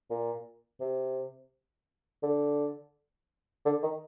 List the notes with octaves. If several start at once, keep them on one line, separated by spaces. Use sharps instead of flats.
A#2
C3
D3
D3
D#3